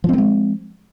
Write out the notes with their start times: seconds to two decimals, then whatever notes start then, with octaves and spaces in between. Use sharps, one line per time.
0.04 F3
0.09 C4
0.13 A#3
0.18 G#3